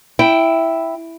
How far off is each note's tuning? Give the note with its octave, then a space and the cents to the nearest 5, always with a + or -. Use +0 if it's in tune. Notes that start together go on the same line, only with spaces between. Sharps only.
E4 +0 G5 +0